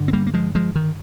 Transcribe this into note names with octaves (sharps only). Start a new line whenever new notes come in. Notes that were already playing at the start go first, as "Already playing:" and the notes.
Already playing: G2 D3
C4
G3 A#3
A#3
F3 G#3
F3 G#3
D#3